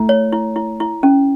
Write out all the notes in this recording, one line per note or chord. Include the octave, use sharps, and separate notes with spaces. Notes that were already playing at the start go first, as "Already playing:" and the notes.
Already playing: A3 E4
C#5
E4
E4
E4
C#4